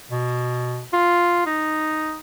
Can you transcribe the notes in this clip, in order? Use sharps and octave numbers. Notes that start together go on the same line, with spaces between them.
B2
F4
D#4